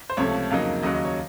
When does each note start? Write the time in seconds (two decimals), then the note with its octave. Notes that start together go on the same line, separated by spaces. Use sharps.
0.10 C5
0.17 C#2 C3 F3 A3 C#5
0.50 F2 C#3 F#3 A#3 D#4 F5
0.83 D#2 C#3 F#3 D#5
0.94 D#5
1.05 C#5